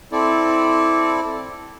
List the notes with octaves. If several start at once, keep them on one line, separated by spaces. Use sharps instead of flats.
C4 E4 A4 D5